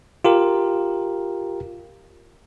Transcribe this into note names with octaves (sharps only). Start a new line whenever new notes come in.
F4 G4 A#4